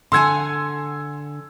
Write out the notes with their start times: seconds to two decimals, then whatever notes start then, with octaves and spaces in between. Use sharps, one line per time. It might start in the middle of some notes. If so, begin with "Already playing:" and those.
0.12 D3 F#5 G#5 C6 E6 G#6